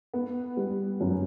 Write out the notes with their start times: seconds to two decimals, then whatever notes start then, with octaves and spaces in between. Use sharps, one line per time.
0.14 B3
0.57 G3
1.00 F#2